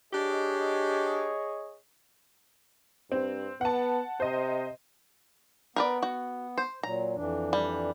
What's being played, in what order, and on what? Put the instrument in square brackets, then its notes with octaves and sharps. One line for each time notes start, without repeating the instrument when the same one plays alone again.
[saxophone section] D4 G4 [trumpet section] G#4 C#5 D#5
[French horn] G2 [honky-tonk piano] C4
[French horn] B3 [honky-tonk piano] F#5 A5
[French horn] C3 [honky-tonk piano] C5 D#5
[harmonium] B3 [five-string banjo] A#4 B4 D5
[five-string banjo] F#4
C5
[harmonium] A#2 F#3 [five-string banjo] A#5
[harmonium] F2 E3 D4
[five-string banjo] G3